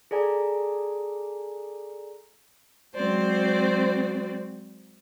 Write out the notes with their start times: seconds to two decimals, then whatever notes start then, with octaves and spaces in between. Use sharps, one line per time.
0.11 G#4 A4 D5 G#5 A#5
2.94 F#3 G#3 C4 F#4 C5 D5